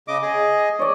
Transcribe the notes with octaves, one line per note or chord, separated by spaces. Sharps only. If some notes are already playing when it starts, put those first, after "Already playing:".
C#3 D#5 D6
G#4 D#5
C#5 D5